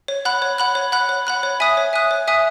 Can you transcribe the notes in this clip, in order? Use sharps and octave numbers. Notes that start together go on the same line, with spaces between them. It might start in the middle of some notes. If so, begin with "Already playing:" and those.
C#5
F#5 B5 F#6
C#5
F#5 B5 F#6
C#5
F#5 B5 F#6
C#5
F#5 B5 F#6
C#5
E5 G#5 D#6 F#6
C#5
E5 G#5 D#6 F#6
C#5
E5 G#5 D#6 F#6